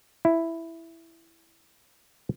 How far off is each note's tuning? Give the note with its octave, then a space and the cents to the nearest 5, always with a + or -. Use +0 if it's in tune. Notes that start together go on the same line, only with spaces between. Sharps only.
E4 +5